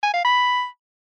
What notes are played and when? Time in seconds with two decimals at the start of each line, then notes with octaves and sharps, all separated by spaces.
0.03 G#5
0.14 F5
0.24 B5